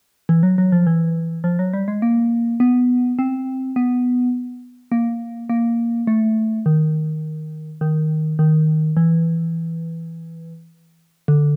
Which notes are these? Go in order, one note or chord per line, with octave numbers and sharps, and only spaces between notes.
E3
F#3
F#3
F3
E3
F3
F#3
G3
G#3
A#3
B3
C4
B3
A#3
A#3
A3
D#3
D#3
D#3
E3
D3